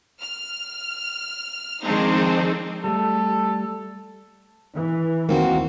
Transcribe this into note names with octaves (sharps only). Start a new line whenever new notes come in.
F6
D#3 F3 G#3 C4 D4 D#4
G3 A3 A4
E3
D#2 D#3 A#3 C4 F#4